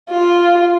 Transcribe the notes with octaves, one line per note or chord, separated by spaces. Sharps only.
F4